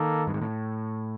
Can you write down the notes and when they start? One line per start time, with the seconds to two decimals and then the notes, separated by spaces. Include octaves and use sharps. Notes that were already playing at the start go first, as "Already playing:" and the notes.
Already playing: D#3 A#3 A4
0.27 G2
0.34 G#2
0.41 A2